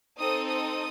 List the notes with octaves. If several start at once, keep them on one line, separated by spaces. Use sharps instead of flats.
C4 D#4 A4 D#6
D#6